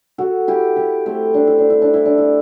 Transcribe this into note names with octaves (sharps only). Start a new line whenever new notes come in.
F#4 A4
E4 G4
E4 G4
A3 C4
D4
E4
D4
E4
D4
E4
D4
E4